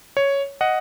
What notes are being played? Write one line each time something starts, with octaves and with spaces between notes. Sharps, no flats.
C#5
D#5 F#5